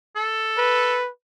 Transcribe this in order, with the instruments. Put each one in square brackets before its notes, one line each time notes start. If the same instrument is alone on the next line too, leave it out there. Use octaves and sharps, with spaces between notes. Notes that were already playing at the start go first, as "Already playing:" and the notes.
[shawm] A4
[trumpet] B4